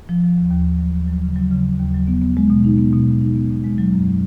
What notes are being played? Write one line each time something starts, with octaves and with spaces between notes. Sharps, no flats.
F3
F3
D#2
D#2
D#2
F#3
D#2
F#3
C#3
F#3
C#3
C#3
D#2
F#3
B3
B3
G#3
B2
D#4
B3
B2
B2
D#4
B3
B2
G#3
F#3
F#2